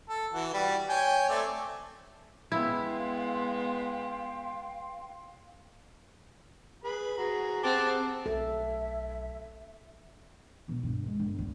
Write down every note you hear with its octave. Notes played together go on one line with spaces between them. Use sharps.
A4
E3 F#4
G3 F#4
C#5 G5 G#5
A3 C4 D5
G#3 B3 E4 F5 G5 C6
G#4 B4 B5
F#4 G#4 A#5
C4 G4 G#4 F#5 A5 D6
B1 A4 E5
B2 B3
G2
G#3
G1
D2